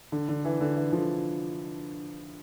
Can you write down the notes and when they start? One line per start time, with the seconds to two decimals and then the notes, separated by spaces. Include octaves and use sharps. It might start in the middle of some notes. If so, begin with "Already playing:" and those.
0.12 D3
0.29 D3
0.45 E3
0.61 D3
0.76 E3
0.92 D3 F3